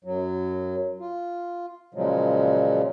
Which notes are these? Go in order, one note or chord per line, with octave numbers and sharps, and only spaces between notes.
F#2 F#3
F4
A#2 C#3 F3 F#3 G#3